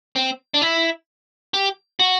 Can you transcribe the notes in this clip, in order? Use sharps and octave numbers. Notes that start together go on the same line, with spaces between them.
C4
D4
E4
G4
F#4